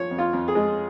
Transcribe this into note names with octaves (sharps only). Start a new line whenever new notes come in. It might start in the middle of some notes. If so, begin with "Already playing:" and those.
Already playing: F3 C#5
F2
F4
F2
G#4
G#3